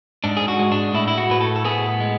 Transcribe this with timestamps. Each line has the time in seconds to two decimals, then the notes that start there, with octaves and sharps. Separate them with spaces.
0.24 G#2 D4
0.37 G#4
0.48 F#4
0.59 G#3
0.72 D4
0.94 A2 E4
1.08 E4
1.18 F#4
1.30 A2 B4
1.41 A4
1.56 A4
1.65 B3 G#4
2.00 G#3